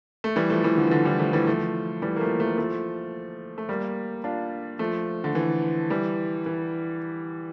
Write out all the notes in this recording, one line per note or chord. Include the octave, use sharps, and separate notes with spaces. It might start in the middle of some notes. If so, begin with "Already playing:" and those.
A3
E3 G3
F3 A3
E3 G3
D3 F3
E3
D3 F3
E3 G3
F3 A3
E3 G3
F3 A3
E3 G3
A#3
F3 A3
F3 A3
F3 A3
A3
G3 A#3
D4 F4
F3 A3
D3
E3
E3 G3
E3